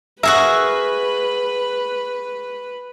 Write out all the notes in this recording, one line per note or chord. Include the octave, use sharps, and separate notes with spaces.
F#4 G#4 A#4 B4 E5